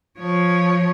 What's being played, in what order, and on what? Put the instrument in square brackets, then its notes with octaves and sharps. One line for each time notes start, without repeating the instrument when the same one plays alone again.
[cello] F3 C#5